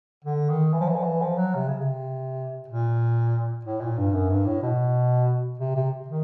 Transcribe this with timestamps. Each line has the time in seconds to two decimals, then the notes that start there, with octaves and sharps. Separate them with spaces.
0.25 D3
0.49 D#3
0.73 E3
0.81 F3
0.89 E3
0.96 F3
1.03 E3
1.22 F3
1.38 F#3
1.55 C3
1.68 C#3
1.82 C3
2.68 A#2
3.65 A2
3.81 A#2
3.98 G2
4.13 F#2
4.30 G2
4.46 A2
4.63 B2
5.59 C3
5.76 C3
6.08 D#3